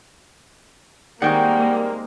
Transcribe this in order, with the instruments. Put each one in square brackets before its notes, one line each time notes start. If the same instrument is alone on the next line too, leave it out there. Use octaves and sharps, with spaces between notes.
[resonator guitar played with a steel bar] D#3 G#3 C4 [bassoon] G3 [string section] A#3 [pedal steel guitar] F#5 G5 C#6